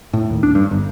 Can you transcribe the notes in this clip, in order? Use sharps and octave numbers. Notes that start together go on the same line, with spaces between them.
A2
D#2
D4
G2
G1